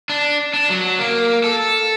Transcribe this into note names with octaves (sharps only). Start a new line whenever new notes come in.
D4
D4
F#3
A#3
A4